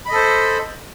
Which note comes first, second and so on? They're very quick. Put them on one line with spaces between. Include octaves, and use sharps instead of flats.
B5 D#5 A4 C5